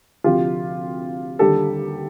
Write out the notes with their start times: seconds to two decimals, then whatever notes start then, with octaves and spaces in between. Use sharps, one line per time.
0.24 D2 C3 F3 F4 G4
1.39 D#2 D3 G3 G4 A4